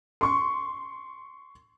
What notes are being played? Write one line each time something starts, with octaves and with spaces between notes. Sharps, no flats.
C6 C#6